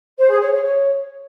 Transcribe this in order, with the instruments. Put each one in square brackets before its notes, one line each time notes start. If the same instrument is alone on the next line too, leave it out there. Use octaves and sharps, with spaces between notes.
[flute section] C5
G#4
C#5
C#5
C#5